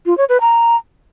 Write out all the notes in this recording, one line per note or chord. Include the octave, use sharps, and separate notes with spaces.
F4
C#5
B4
A#5